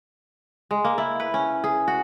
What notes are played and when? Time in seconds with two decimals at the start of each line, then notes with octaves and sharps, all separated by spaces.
0.71 G#3
0.84 A#3
0.98 E4
1.20 B4
1.34 C#4
1.64 G#4
1.88 F#4